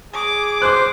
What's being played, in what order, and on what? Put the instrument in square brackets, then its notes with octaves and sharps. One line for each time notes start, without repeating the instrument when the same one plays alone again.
[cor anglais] G#4 [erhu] D6
[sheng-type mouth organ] C5 [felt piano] D6 F#6